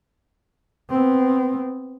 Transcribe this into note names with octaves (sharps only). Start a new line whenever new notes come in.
B3 C4